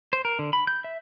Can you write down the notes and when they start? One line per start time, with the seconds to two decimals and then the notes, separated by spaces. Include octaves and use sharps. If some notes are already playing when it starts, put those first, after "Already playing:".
0.13 C5
0.25 A#4
0.39 D3
0.53 B5
0.67 G6
0.84 E5